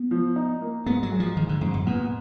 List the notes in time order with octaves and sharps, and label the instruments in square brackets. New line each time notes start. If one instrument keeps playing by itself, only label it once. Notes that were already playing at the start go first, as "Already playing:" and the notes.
Already playing: [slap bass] B3
[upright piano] F3
D#4
A#3
[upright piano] G#2 [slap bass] B3
[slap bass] F#3
[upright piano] G#3
[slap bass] F3
[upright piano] G#2 [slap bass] D#3
[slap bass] D3
[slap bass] F2 [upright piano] G#2
[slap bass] F#2
[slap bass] A#2 [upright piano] B3